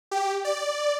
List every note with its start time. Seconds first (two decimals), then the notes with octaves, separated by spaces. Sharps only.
0.11 G4
0.45 D5